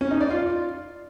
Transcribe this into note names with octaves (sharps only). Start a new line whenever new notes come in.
C#4
D#4
D5
F4